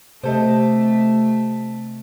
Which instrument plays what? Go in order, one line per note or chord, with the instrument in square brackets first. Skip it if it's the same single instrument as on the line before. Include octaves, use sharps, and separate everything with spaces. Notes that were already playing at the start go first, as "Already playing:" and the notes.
[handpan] C3 G4 D#5 [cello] A3 [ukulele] A4 C5